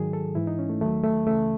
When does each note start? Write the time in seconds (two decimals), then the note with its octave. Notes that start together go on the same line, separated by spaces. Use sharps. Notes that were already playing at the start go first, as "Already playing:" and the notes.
Already playing: G#2 D#3 F#3 G#4
0.13 A4
0.35 G#2 E3 E4
0.47 D#4
0.59 C#4
0.69 A3
0.81 D#2 D#3 F#3 A3
1.03 A3
1.26 C#2 C#3 E3 A3